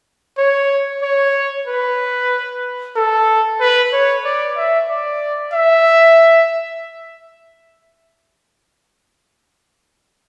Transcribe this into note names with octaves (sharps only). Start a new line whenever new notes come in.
C#5
C#5
B4
A4
B4
C#5
D5
E5
D5
E5